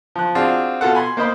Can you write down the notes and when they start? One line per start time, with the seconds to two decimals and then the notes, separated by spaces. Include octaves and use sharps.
0.16 F3 F#6
0.35 C4 D4 F4 F#4 G#4
0.81 B2 F4 A4 F#5
0.95 G#5 B5 C6
1.17 A#3 C5 D#5 B5